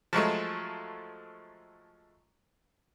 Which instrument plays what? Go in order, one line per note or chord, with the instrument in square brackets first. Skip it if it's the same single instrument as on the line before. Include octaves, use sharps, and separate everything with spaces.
[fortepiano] F3 F#3 G#3 A3